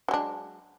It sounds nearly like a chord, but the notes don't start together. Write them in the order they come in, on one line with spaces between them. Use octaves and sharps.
F#3 G#3 D4